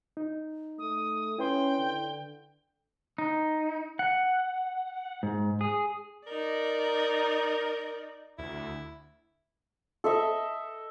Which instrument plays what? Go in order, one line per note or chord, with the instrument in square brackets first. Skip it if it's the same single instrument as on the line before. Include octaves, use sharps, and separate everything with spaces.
[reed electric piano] D#4
[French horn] A3 [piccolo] D#6
[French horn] C#4 [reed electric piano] E4 B4 C6 [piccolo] G5
[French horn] D3
[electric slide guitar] D#4
F#5
G#2
G#4
[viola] D#4 D5 [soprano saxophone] A#4
[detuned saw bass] D2 [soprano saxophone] E4
[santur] A4 D#5 E5